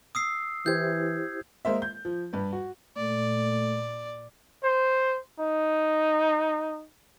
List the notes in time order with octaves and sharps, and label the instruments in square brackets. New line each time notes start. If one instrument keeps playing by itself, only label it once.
[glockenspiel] D#6 E6 C7
[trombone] E3 [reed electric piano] E4 G4 C5 [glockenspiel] G6 G#6
[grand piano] G#3 A#3 C5 E5
G6
F3
G2 B4
F#4
[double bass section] A#2 [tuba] A3 [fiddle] D5
[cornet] C5
D#4